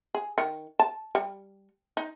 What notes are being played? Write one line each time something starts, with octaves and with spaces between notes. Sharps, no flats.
G#4
D#3
A5
G3
D#4